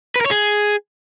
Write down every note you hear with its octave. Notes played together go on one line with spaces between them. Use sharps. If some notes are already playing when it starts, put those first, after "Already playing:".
B4
A#4
C#5
G#4